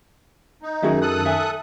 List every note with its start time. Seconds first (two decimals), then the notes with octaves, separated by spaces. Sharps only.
0.63 D#4
0.83 F#2 D#3 F#4 G#4 E5
1.01 A4 D#6 F#6
1.25 E5 G#5